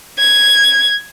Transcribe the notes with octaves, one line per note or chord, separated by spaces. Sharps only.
G#6